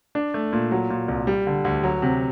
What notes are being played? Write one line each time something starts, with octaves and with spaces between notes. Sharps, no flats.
D4
A3
A#2
F#3
A#2
C2
G3
D3
D2
F#3
C3